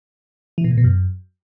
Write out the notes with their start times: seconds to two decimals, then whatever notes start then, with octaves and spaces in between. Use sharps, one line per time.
0.58 E3
0.64 B2
0.71 A2
0.78 B2
0.84 F#2